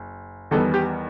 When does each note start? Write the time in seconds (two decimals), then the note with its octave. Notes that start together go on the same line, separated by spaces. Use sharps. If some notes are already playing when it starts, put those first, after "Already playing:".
Already playing: F#1
0.51 E2 D#3 G3 B3 A4
0.74 G4